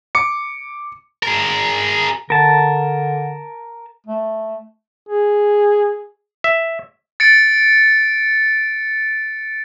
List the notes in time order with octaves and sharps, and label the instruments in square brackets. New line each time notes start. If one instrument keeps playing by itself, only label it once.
[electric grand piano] D6 C#7
[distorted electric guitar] G#4 A#4
[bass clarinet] D3 [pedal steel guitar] A#4 A5
[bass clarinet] A3
[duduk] G#4
[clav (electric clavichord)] E5
[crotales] A6 C#7 D7